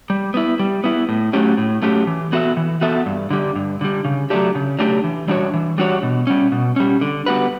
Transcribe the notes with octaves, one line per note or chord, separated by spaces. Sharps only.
G3
B3 E4
G3
B3 E4
A2
F#3 A3 C#4 G4
A2
F#3 A3 C#4 G4
E3
B3 F#4 A4 E5
E3
B3 F#4 A4 E5
G2
D3 G3
G2
D3 G3
C#3
F#3 A3 D4 G4
C#3
F#3 A3 D4 G4
E3
G3 D4 F#4 C#5
E3
G3 D4 F#4 C#5
B2
G3 C#4
B2
G3 C#4
D3
G3 B3 F#4 B4